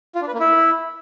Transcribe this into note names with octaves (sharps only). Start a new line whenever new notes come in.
F4
D4
B4
A#3
E4